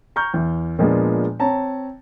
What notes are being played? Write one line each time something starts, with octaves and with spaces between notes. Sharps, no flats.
A#5 C#6 F6 G6
E2
A#2 F3 G#3 B3 D4
C4 C#5 A5 A#5